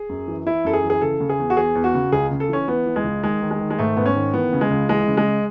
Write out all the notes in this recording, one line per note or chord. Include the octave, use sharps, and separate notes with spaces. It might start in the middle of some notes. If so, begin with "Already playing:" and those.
Already playing: G#4
F#2
E3
E3 E4
F#2 A4
G#4
E3
G#4
C#3 A4
C#3
G#4
E2
F#4
E2 G#4
E2
F#4
C#3
C#2 G#4
C#3
A4
E3 C#4
E3 B3
E3
G#3
C#2
D#3 G#3
D#3
G#3
D#3
G#3
G#2 A3
G#2 B3
C#4
D#3
E3 B3
C#3
G#3
C#2
E3 G#3
C#3
G#3